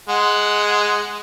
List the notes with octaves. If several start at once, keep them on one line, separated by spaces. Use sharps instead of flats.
G#3 F#5